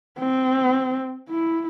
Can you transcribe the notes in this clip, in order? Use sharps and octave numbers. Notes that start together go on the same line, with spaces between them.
C4
E4